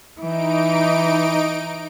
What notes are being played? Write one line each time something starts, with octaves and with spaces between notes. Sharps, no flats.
E3 D#4 D7